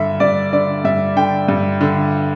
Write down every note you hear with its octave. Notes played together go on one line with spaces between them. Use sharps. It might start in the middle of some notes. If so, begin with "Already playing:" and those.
Already playing: G2 D3 E5
G2 D5
D3 D5
G2 E5
D3 G5
G2
D3